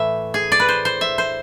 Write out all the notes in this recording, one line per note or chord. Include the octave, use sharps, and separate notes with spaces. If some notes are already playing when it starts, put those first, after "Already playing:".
Already playing: A2 E3 A3 E5
G#4
D5
B4
C5
C5
E5
C5